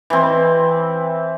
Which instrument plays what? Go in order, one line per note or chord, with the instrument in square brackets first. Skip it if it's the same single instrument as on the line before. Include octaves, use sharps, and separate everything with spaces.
[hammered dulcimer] E3 C4